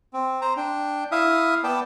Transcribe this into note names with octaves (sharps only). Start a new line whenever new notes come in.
C4
C5 A#5
D4 G5
E4 E5 F5 D#6
B3 D5 G5 A5